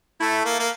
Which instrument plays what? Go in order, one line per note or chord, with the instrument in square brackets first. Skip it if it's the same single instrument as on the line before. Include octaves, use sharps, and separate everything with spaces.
[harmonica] A3 [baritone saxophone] E4
[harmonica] A#3
A#3